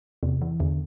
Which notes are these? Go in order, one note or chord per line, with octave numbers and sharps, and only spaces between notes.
E2 C3
E3
E2 D3